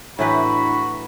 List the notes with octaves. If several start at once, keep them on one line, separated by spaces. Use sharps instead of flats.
A2 E3 D4 E4 F#4 B4 A#5 B5